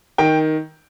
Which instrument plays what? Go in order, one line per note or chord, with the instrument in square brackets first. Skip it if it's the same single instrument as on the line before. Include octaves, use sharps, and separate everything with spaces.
[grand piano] D#3 G5